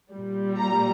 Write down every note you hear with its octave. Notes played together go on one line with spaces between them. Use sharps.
A#2 G3
A#5